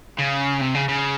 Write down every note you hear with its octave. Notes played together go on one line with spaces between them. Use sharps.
C#3
C3
C#3
C#3